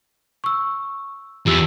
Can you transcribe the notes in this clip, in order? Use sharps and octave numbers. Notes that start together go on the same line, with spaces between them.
C#6 E6
E2 F4 G4 E6